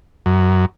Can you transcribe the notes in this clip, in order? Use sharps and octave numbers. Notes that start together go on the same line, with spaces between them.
F#2